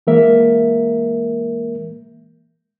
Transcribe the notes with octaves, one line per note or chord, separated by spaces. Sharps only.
E3 G#3 A#3 A#4 E5